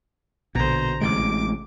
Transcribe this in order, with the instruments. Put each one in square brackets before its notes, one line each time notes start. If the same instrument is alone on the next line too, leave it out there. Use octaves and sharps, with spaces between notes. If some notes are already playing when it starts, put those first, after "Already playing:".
[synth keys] A#1 D3 [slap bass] B2 [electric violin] C5 A#5
[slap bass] A1 C3 G#3 [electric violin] D6 D7